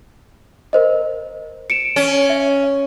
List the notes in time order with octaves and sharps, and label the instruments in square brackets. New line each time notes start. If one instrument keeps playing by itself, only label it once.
[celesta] A#4 C5 D#5
C#7 D7 E7
[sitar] C#4
[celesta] E5